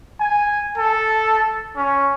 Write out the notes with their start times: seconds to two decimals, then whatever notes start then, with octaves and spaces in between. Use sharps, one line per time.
0.20 G#5
0.78 A4
1.77 C#4